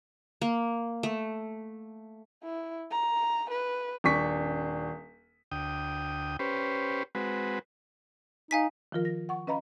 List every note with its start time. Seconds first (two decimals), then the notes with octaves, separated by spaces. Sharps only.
0.42 A#3
1.03 A3
2.44 E4
2.91 A#5
3.50 B4
4.04 D#1 D4 C#6 B6
5.52 D2 G5 D#6
6.39 C#4 G4 B4 C5
7.15 G#3 C4 F#4 B4
8.51 D#4 F5 G#5 B6
8.92 D#3 F3 F4 A#4
9.05 A#6
9.29 F#5 C#6
9.47 C#4 B4 D#5 F5 A#5 B5